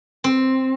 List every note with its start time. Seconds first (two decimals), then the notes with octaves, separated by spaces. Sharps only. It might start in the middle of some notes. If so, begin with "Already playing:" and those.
0.24 C4